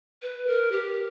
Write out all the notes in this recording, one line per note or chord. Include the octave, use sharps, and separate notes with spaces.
B4
A#4
G4